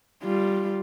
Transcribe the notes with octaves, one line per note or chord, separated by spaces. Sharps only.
G3 F4